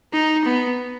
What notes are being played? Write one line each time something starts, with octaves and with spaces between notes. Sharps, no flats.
D#4
B3